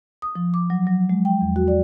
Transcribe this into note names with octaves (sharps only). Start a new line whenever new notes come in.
D#6
F3
D6
F#3
F#3
G#3
G5
E2
F#4
D5